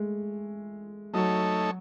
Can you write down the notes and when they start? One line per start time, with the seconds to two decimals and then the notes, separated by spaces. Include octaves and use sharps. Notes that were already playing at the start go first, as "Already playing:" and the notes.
Already playing: G#3 A3
1.13 F#3 A3 D#4 A4 C#5